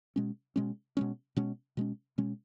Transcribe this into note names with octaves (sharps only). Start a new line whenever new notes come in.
B2 G#3 C#4
B2 G#3 C#4
B2 G#3 C#4
B2 G#3 C#4
B2 G#3 C#4
B2 G#3 C#4